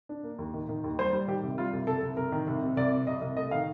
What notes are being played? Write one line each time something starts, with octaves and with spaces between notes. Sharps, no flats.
D4
A#3
D#2
D#3
D#3
D#2
G3 C5
G3
D#3 G4
C2
G3 F4
C2
C2 A4
C2
C2 A#4
D#3
C2
C3
C2 D5
C3
C2 D#5
C2
A3 D#5
D#3 F5